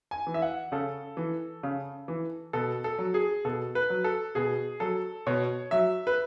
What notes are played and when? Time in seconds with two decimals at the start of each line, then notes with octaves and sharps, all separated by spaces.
0.11 G#5
0.27 E3
0.34 E5
0.42 F#5
0.72 C#3 A4
1.17 E3
1.63 C#3
2.08 E3
2.53 B2 A4
2.84 A4
2.98 F#3
3.14 G#4
3.45 B2 A4
3.75 B4
3.90 F#3
4.04 A4
4.35 B2 G#4
4.80 F#3 A4
5.27 B2 C#5
5.71 F#3 E5
6.07 B4